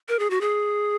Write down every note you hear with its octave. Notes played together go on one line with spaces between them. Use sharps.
A#4
G#4
F#4
G#4